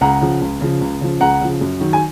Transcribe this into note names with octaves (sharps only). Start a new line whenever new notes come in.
C#2 F#5 A#5
C#3 F3
C#2
C#3 F3
C#2
C#3 F3
C#2 F#5 A#5
C#3 F3
F#2
D#3 F#3
G#5